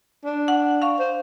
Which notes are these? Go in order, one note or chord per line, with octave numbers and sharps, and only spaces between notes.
D4
F#5
F5 C#6
C5